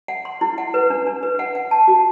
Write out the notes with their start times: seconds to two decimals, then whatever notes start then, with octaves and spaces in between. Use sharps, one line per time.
0.08 F#5
0.25 C6
0.41 E4
0.58 F#5
0.74 B4
0.90 D4
1.07 D4
1.23 B4
1.39 F#5
1.55 F#5
1.71 A5
1.88 F#4